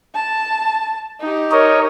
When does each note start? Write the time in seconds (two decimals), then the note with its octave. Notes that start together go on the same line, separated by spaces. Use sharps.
0.14 A5
1.20 D#4 G4
1.51 A#4 C#5 D#5